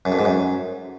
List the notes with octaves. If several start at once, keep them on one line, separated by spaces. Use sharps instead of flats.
F#2
F2
G#2
F#2